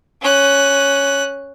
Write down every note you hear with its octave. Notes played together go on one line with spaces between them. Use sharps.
C#4 F#6